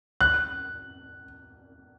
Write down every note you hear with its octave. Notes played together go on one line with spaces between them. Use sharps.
F#6